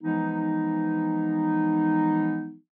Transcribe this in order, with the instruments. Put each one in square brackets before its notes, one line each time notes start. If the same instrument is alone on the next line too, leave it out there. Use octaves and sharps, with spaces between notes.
[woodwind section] E3 F3 G#3 B3 D#4